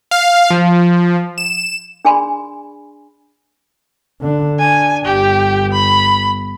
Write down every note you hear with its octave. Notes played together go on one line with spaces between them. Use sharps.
F5
F3
E7
D4 G#4 D5 G#5 B5 C6
D3 D4
D4 G#5
G1 G4
B5